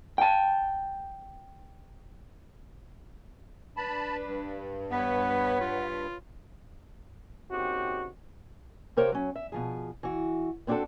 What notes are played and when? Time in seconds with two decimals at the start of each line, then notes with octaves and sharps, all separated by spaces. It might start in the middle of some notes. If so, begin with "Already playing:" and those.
0.18 G5 A5
3.77 D4 B4 A5 B5
4.25 G2
4.91 B3 B4 C#5 F#5
5.60 F4
7.51 A#2 C#3 C4 D#4 F#4 G4
8.97 C3 G4 A#4 C5 C#5 F5
9.12 F#3 C#4
9.36 E5
9.52 B2 F3 G#4
10.03 E3 F#4
10.67 B3 C4 D4 F4 F#4 A4